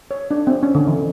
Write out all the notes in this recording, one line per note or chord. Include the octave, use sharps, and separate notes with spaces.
C#5
D4
C4
C#4
D3
E3